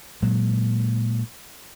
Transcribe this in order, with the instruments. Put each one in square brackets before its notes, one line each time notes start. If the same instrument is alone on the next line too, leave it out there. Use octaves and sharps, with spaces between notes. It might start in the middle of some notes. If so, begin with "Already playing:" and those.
[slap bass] A#2 F#3 G#3